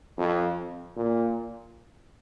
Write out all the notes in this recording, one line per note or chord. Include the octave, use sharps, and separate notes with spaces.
F2
A#2